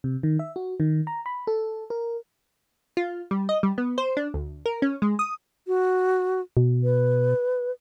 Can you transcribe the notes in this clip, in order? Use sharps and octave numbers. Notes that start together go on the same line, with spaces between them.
C3
D#3
E5
F#4
D#3
A#5
B5
A4
A#4
F4
G3
D#5
G3
B3
C5
D4
D2
A#4
C#4
G#3
D#6
F#4
B2
B4